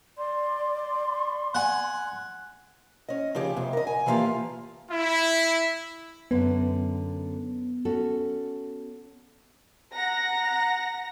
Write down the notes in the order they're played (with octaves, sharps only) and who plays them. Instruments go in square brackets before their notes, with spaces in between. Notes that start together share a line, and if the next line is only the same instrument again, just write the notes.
[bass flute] D5 [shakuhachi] C6
[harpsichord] F#5 G#5
[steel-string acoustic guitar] C#4 D#5
C#3 F3 G4 G#4
F2 C3
A#4 D#5
G#5
E3 F3 G3 A#3 F4 G4
[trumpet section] E4
[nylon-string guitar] F#2 D3 [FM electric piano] B3
[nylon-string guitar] C#4 F#4 A4
[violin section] F#5 A#5 A#6